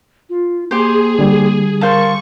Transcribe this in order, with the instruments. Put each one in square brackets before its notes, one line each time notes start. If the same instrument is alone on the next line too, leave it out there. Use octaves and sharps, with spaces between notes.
[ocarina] F4
[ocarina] A#3 [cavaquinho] G4 C5 [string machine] G#4
[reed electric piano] D3 G3
[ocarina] A#4 [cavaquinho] C5 F5 A5 [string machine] C#6